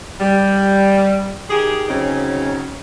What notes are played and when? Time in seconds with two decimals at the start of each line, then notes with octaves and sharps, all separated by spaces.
0.21 G3
1.50 D#3 G4 G#4
1.89 C#3 F#3 C4 C#4 D#4